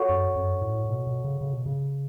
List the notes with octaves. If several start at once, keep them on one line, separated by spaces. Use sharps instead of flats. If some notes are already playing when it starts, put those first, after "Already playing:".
Already playing: F#4 A4 C#5 F#5 C#6
F#2
F#2
A2
A2
B2
B2
C#3
C#3
B2
C#3